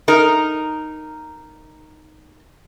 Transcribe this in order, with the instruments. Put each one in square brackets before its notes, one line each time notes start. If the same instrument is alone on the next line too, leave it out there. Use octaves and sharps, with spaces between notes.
[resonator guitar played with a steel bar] D#4 A#4